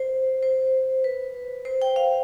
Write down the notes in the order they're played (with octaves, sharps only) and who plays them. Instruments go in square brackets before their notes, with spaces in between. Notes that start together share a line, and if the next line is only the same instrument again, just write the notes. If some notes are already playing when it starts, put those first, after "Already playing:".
Already playing: [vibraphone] C5
C5
B4
C5
G5
F5